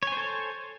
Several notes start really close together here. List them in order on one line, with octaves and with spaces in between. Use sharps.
C#5 G#5 C5 A4